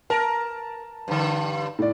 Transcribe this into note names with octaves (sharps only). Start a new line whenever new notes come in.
A#4 A5
G2 D3
A2 D5